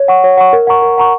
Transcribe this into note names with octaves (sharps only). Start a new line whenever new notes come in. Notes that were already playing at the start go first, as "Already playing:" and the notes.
Already playing: C#5
F#5 C#6
C#5
F#5 C#6
A#4
F#5 A#5 C#6
A#4
F#5 A#5 C#6